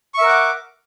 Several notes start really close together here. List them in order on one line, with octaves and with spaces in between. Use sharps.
C#6 E5 A#4 F#5 D6